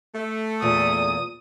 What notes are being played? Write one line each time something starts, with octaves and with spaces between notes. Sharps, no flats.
A3
E2 A#2 D#6